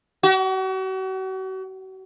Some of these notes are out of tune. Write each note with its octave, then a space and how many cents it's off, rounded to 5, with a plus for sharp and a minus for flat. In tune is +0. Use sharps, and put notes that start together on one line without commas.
F#4 +40